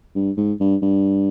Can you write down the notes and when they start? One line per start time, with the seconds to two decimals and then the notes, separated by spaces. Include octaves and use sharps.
0.15 G2
0.37 G#2
0.60 G2
0.82 G2